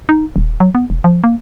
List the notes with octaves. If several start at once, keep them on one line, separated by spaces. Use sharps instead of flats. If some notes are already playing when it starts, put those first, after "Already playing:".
D#4
D#1
F#3
B3
E1
F3
A#3